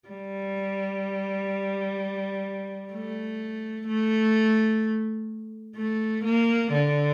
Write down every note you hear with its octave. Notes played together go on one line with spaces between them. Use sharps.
G3
A3
A3
A3
A#3
D3